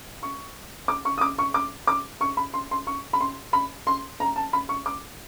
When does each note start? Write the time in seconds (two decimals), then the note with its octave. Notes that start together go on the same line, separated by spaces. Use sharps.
0.23 C#6
0.88 D6
1.05 C#6
1.18 D#6
1.21 D6
1.38 C#6
1.54 D6
1.87 D6
2.21 C#6
2.37 B5
2.54 C6
2.71 C6
2.87 C#6
3.13 B5
3.21 C6
3.53 B5
3.87 C6
4.20 A#5
4.36 A5
4.53 B5
4.69 C#6
4.86 D6